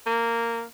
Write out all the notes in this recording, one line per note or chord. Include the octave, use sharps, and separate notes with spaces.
A#3